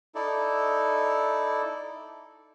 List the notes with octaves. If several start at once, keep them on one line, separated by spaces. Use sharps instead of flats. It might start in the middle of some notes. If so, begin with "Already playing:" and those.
D#4 E4 A4 D5